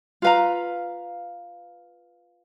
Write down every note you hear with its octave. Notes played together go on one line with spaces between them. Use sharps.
F4 B4 F5 A#5